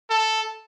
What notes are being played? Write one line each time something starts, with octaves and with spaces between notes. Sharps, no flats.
A4